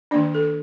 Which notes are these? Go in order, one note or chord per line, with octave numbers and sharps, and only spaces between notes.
D#3 A#3 D4 D5
A4